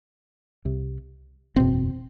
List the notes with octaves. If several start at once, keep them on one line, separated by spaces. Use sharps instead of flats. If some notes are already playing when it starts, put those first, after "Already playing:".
C2 C3
F#1 E2 B2 C4